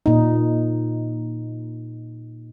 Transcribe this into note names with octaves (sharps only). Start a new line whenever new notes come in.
A#2 D#4